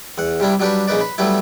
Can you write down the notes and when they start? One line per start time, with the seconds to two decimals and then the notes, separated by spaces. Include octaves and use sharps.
0.18 E2 F#5
0.40 C3 G3 D4 E4
0.60 F#3 G3 D4 F#4 G4 B4
0.88 A#1 C#3 D#4 B4 D5
1.00 B4
1.18 F#3 G3 A3 B3 E4